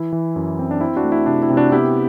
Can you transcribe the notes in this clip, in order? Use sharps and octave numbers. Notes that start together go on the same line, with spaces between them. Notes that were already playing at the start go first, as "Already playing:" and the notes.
Already playing: E3 E4
E3
F#2
C4
D4
C4 E4
D4 F#4
A3
E4
C3 D4
E4
C3
D4 F#4
B3 E4 G4